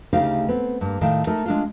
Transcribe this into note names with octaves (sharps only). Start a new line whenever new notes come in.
D2 C#3 A3 D#4 G4 F5
B3 C4
G2 A#3
A2 D#3 E5 F5 G5
A3 D#4 A#4 E5
G#3 D4 F4